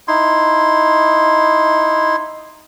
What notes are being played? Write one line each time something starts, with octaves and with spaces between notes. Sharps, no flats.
D#4 E4 C6